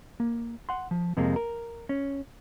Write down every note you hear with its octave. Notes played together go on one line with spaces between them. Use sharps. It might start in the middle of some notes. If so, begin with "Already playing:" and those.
A#3
F#5 C6
F3
F2 C3 G#3 A#3
A#4
C#4